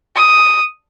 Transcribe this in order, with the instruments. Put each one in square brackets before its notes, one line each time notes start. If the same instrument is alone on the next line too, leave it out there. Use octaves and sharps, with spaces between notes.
[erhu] D#6